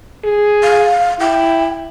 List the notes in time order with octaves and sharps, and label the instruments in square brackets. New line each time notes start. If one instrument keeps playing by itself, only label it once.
[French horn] G#4
[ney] F5
[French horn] E4 [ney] G5